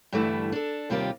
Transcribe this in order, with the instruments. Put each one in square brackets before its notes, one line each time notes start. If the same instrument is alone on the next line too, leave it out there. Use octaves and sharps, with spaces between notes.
[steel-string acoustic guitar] G2 D3 E3 G3 A3 E4
D4 A4
D#2 C3 G3 A#3 F4 G4